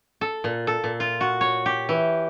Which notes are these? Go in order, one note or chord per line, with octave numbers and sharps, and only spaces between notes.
A4
A#2
A4
A#2
F4
F#4
C#5
G4
E3